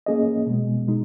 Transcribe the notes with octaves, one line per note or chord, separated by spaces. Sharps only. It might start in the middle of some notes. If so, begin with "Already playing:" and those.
A#3 C#4 G#4 D#5
B2 G#3 B3
B2 G#3 D#4